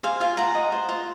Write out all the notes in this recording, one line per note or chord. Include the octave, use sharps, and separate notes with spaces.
C5 F5 G#5
F4 F5 G#5
F4 F#5 A#5
D#5
C5
F4